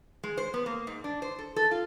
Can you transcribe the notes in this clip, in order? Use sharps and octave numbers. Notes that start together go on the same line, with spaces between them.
G#3
C5
B3
A#3
G#2
D4
C5
A4
A4
F4